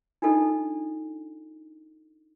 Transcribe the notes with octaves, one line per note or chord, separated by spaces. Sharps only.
D4 D#4 F4 A4 D#5